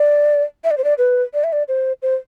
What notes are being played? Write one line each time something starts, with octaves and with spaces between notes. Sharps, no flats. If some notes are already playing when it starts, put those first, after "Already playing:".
Already playing: D5
E5
D5
C5
D5
B4
D5
E5
D5
C5
C5